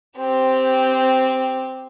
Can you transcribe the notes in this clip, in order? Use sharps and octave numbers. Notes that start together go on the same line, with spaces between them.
C4 G4